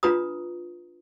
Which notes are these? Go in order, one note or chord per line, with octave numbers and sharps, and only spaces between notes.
D4 F4 B4 A#5 D#6